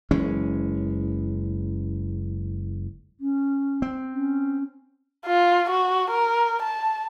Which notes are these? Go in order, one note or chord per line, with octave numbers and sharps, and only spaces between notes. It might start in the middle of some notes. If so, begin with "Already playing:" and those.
F#1 E3 G#3 C#4
C#4
C4
C#4
F4
F#4
A#4
A5